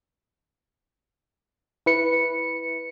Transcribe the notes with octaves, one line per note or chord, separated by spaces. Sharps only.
E4 B4 C#7